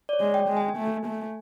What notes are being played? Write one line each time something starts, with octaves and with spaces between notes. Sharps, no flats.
D5
C#5
G#3
G5
G#3
G#5
A3
A3